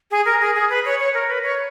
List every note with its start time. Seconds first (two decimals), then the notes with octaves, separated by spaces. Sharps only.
0.11 G#4
0.26 A#4
0.41 G#4
0.55 G#4
0.70 B4
0.85 C#5
0.99 C#5
1.14 A#4
1.29 B4
1.43 C#5